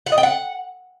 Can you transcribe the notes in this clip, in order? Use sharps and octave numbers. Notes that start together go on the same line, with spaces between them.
F#5
D#5
G5
F#5